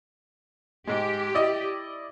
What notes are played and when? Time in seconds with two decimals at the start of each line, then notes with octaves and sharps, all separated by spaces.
0.87 G#2 G#3 G4
1.34 E4 D5 D#5